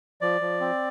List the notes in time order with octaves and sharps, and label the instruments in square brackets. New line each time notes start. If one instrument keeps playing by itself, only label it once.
[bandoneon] F3 D5
F3
C4